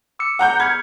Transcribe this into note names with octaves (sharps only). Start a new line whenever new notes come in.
D6 E6 C#7
F#5 A#5 G6
B5 F6 G#6 C#7